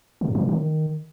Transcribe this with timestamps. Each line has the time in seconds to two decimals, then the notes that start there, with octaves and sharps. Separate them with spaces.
0.21 C#3
0.28 G2
0.35 E3
0.42 B2
0.49 D#3